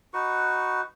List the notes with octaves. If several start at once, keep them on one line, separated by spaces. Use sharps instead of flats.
D#4 F#4 B4 C#6